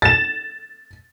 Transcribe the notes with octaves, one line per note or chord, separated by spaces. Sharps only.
A6 E7